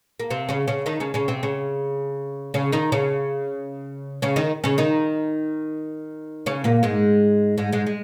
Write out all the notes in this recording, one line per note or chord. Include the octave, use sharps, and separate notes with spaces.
A#3
C3 C4
C#3 C#4
C#3 C#4
D#3 D#4
C#3 C#4
C#3 C#4
C3 C4
C#3 C#4
C#3 C#4
D#3 D#4
C#3 C#4
C#3 C#4
D#3 D#4
C#3 C#4
D#3 D#4
C#3 C#4
A#2 A#3
G#2 G#3
G#2 G#3
G#2 G#3
G#3